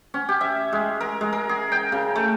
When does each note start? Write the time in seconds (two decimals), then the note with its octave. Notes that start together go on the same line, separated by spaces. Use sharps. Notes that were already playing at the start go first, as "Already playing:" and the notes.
0.14 C#4
0.29 G4
0.41 E5
0.73 G#3
1.00 A#4
1.21 G#3
1.33 A#4
1.49 G#4
1.72 G5
1.92 C#3
2.16 A3